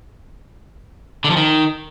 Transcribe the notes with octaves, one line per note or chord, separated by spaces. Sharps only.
D3
F3
D#3